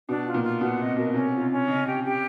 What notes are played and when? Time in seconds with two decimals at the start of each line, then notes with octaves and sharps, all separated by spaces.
0.08 B2 D4
0.25 F4
0.34 A#2
0.44 F4
0.61 B2 F#5
0.79 C3 D#5
0.97 B2 A#4
1.14 C3 C#4
1.32 F4
1.42 C3
1.50 C#4
1.67 C#3 D#5
1.85 G4
2.03 G4